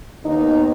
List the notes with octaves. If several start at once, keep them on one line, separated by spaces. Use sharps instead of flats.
D#2 D#3 B3 D#4